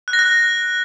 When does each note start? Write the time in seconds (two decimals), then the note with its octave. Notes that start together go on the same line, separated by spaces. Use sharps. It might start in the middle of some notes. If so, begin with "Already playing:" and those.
0.08 F#6
0.13 A#6
0.19 F#6